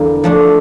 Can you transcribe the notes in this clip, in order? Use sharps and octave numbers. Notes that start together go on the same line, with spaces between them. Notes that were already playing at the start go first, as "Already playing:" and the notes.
Already playing: E2 D3 G3 A#3
F3 A3 D4